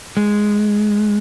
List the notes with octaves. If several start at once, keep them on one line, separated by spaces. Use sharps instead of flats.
G#3